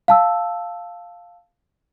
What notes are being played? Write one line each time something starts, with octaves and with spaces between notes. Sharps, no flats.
F5 A5 E6